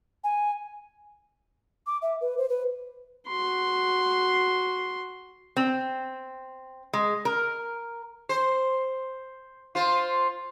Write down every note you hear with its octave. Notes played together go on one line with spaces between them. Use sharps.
G#5
D6
E5
B4
C5
B4
F#4 C6
C4
G#3
A#4
C5
F4 C5